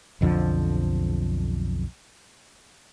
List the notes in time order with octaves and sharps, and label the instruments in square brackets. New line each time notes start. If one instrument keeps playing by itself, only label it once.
[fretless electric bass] B1 F2 D3 F3